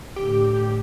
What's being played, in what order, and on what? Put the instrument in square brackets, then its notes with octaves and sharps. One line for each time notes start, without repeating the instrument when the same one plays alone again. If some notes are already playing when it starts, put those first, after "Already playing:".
[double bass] A2 D3 [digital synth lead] G4